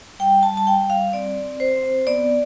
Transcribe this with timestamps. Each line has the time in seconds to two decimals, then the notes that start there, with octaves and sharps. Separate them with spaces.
0.19 G3 G5
0.43 A5
0.50 G3
0.57 A5
0.67 G5
0.81 G3
0.90 F5
1.13 C4 D5
1.44 C4
1.60 C5
1.76 C4
2.07 B3 D5